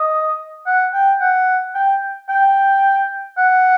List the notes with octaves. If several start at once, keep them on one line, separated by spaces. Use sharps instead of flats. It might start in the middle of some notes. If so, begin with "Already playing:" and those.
Already playing: D#5
F#5
G5
F#5
G5
G5
F#5